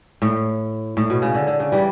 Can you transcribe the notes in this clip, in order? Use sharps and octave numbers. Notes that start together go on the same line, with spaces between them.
A2
A2
B2
C#3
D3
D3
C#3
E3 G3